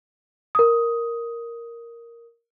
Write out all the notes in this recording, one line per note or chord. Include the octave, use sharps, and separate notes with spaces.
A#4 D#6